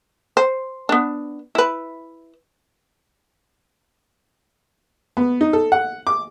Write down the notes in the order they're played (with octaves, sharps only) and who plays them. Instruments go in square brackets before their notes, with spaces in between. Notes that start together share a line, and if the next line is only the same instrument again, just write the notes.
[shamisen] C5
B3 D4
E4 B4
[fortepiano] B3
D#4
A4
F#5
D6